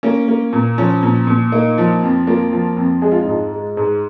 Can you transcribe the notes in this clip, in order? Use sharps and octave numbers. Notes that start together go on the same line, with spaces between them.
A#3 C#4
A#3
A#2
F3 C#4
A#2
A#2
A#3 D#4
F3
F2
A#3 F4
F3
F2
G#3 G#4
F4
D#4
G#2 F4
G#3
G#2